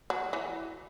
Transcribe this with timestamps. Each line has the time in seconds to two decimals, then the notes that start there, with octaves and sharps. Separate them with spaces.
0.10 F#3
0.33 E3